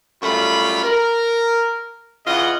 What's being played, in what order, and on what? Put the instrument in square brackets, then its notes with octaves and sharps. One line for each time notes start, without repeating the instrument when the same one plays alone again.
[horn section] F#2 G3 A3 F4 B5
A#4
C#3 E3 F4 D#5 F#5